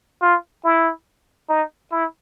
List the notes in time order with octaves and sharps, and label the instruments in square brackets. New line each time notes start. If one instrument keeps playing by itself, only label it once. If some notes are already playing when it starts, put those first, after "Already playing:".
[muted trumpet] F4
E4
D#4
E4